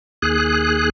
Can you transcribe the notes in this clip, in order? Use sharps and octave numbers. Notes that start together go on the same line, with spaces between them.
D#2 G#4 F#6